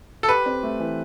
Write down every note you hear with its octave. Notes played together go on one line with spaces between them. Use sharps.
A4
G4 B4
C4
A3
E3